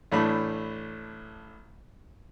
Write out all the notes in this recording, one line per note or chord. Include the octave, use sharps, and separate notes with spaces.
A1 A2 A3 D4 B5